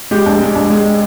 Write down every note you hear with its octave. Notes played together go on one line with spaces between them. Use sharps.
G#3 G4
A#1
G#3
A#1
G#3